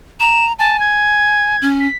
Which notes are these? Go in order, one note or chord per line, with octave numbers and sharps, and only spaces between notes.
A#5 E7
G#5 A5
G#6
C#4
B6